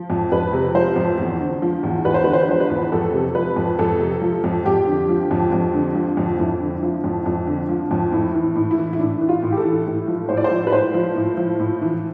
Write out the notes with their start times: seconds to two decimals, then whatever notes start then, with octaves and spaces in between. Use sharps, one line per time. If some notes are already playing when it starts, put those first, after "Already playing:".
Already playing: F3
0.10 F2
0.32 F2 B4
0.53 C3
0.75 F3 C5
0.96 F2
1.18 E2
1.40 D3
1.62 F3
1.83 E2
2.05 E2 B4
2.14 C5
2.24 D3 B4
2.33 C5
2.43 B4
2.48 F3 C5
2.60 B4
2.70 E2
2.92 F2 A4
3.14 C3
3.35 F3 B4
3.56 F2
3.79 F2 A4
4.00 C3
4.22 F3
4.44 F2
4.65 F2 G4
4.87 D3
5.09 F3
5.31 F2
5.52 F2
5.74 D3
5.95 F3
6.17 F2
6.39 F2 E4
6.60 D3
6.83 F3
7.04 F2
7.26 F2
7.47 D3
7.68 F3
7.91 F2
8.12 A2
8.34 E3
8.55 A2
8.71 E4
8.78 E3
8.93 E4
8.99 A2 D4
9.21 E3
9.29 F4
9.42 A2
9.52 G4
9.57 A4
9.64 E3
9.86 A2
10.08 F3
10.29 A2 C5
10.37 D5
10.44 C5
10.51 F3
10.67 B4
10.72 A2 C5
10.94 F3
11.16 A2
11.37 F3
11.59 A2
11.81 E3